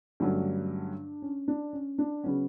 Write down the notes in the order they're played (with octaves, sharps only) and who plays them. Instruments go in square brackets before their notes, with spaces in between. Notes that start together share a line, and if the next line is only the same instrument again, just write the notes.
[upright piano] G2 D3 F#3 A3 C#4 [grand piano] D4
[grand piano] C#4
D4
C#4
D4
[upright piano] C#3 F#3 B3 [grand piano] C#4